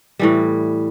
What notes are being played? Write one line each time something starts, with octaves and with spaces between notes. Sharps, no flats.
A2 E3 G3